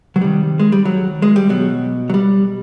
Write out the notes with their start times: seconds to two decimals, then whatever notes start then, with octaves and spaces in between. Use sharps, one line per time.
0.16 F#3
0.21 C3 D#3 G3
0.59 G#3
0.72 G3
0.85 F#3
1.22 G#3
1.36 G3
1.49 B2 F#3
2.10 F#3
2.14 G3